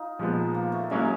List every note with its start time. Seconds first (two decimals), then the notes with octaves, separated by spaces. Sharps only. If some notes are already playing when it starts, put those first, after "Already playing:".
Already playing: D#4 F4
0.19 A#2 F3 G#3 B3
0.55 A#3
0.72 A3
0.90 F#3 G#3 A#3 C#4 E4